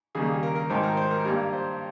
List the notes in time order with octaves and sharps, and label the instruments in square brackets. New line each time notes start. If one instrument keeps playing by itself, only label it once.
[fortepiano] D#2 C#3 G3 A#3 G#4
G#4
A#4
A#4
G#1 G#2 D#3 C5
A#4
C5
A#4
G2 G3 A#3 A#4
C5